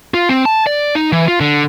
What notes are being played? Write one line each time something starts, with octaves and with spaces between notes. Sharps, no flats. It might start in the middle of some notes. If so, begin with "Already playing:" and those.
F4
C4
A5
D5
D#4
E3
F4
D3